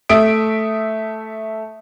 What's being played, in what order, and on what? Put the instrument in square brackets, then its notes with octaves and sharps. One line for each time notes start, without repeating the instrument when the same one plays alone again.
[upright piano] A3 E5 D#6 D7